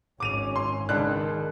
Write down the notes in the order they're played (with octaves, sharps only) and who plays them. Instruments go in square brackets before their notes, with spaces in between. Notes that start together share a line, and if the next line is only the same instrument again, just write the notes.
[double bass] G#1 C#4 [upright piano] D6 D#7 F7
[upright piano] C6
[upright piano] C#2 D4 F#6 [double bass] D#3